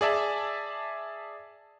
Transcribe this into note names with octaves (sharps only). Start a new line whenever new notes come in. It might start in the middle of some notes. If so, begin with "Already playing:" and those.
G#4 D5 E5 A5